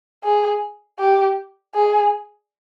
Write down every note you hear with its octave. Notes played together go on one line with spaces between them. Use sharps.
G#4
G4
G#4